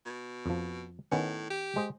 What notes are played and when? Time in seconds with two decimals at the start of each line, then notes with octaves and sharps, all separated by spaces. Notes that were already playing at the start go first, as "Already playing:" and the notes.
0.06 B2
0.46 F2 F3
1.12 A2 D#3 B3 C#4
1.50 G4
1.76 G#3 C5 D#5